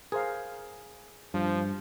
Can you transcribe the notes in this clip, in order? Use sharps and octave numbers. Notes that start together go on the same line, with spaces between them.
G#4 A#4 C5 F5
G2 F3